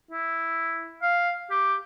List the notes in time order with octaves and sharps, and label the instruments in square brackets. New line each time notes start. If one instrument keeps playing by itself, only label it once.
[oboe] E4
F5
G4